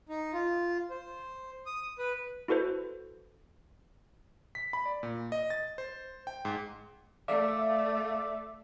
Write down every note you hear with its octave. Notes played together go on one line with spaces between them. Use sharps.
D#4
F4
C5
D#6
B4
E4 F#4 A4 B4 C5
B6
B5
D5
A#2
D#5
A6
C5
G5
G#2
A3 D5 E5 F5 D6